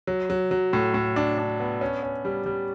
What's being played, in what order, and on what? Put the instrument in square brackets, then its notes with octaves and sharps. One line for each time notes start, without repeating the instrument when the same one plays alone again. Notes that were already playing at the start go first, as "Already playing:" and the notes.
[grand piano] F#3
F#3
F#3
A2
A2
D4
D4
B3
C#4
C#4
G3
G3